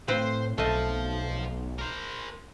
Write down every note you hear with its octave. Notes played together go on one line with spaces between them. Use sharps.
A2 C4 B4 C5 F5
B1 A3 C5 D#5 F5
A#4 C5